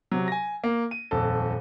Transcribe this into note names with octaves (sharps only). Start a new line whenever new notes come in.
C3 F#3
G#5 A#6
A#3
D#7
D#1 F2 A4